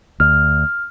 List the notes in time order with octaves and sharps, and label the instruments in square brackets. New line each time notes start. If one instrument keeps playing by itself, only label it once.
[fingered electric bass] D2 [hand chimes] F6